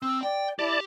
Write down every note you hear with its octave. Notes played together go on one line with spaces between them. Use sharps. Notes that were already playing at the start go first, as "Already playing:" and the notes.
C4 E6
D5 G5
E4 G4 D5 A5